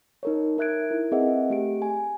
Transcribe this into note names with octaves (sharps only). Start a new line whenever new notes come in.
D#4 A#4 C#5
D#4 A#4 E5 F#6 G#6 D7
E4 A#4
C4 G#4 B4 D#5 E5 F#5
A3 G4 D7
G#5